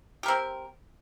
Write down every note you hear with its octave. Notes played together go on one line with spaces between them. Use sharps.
C4 G4 A#4